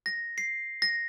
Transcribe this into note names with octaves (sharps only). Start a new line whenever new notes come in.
A#6
C7
A#6